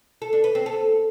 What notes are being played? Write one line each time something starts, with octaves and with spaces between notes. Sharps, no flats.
A4
D4
B4
C4
A4